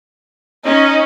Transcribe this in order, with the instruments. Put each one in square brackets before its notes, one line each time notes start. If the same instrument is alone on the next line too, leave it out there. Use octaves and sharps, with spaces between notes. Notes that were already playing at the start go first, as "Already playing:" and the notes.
[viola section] C#4 [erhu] D#4